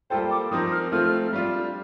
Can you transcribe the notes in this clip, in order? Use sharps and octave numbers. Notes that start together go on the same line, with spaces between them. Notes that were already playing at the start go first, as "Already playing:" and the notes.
G3 A#3 F4 A4 C5 G5
D6
F3 C4 D#4 A#4 D#6
F6
F3 A3 C4 F4 A4 F6
G3 D4 F4